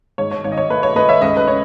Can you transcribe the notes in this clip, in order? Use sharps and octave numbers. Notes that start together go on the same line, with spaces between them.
G#2 C#5
C#5
G#1 C#5
D#5
C#5
A3 B4
C#5
A3 B4 D#5
C#5 E5
C#2 B4 D#5
B4
C#3 C#5